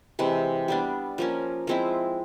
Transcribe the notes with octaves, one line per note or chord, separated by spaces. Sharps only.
C3 E3 G#3
G3 B3 D4
F3 A#3 C#4
F3 G#3 C4 E4